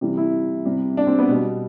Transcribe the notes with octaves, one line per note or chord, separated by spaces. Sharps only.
C3 E3 G3
E4
C3 G3
D4
C4
B3
B2 G3